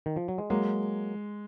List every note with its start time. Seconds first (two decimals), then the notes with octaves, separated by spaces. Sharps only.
0.06 D#3
0.16 F3
0.28 F#3
0.38 G#3
0.50 F#3 G#3 A#3